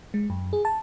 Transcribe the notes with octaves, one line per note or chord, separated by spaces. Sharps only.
G#3
F#2
G#4
A5